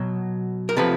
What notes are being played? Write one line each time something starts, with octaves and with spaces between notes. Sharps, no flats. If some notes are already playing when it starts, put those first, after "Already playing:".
Already playing: B2 F#3
A#4
C3 F3 A4 B4